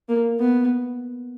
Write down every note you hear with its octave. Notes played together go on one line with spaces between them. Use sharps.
A#3
B3